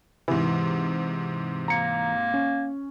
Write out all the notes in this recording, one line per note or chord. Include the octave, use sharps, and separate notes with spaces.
G#2 C3 E3
A#3 A#5 C#7
C#4